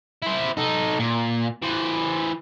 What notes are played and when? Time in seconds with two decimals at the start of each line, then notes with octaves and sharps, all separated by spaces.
0.22 E4 C5
0.57 D#4 A4
0.99 A#2
1.62 E3 C5